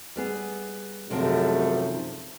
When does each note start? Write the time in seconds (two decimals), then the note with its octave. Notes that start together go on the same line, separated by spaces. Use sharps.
0.16 G3 B3 G#4
1.10 F#2 C3 D#3 F3 G#3 A3